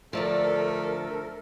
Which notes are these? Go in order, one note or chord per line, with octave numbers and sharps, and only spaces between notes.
A2 D3 F3 A3 A4 A#4 D5